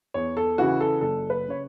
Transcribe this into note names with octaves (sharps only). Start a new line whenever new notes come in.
E2 C#5
A4
C#3 E3 F#4
A4
F#1 A4
B4
C#3 C#5